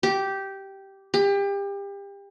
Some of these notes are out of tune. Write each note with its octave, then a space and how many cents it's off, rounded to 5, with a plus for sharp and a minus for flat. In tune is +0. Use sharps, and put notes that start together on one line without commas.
G4 -10
G4 +30